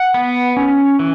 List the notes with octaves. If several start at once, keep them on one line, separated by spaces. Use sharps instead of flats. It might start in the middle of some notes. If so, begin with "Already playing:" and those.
Already playing: F#5
B3
C#4
E3